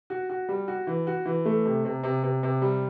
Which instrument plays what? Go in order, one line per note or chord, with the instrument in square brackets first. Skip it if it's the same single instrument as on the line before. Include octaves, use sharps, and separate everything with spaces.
[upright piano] F#4
F#4
G3
F#4
E3
F#4
E3
A3
C3
C3
C3
C3
C3
G3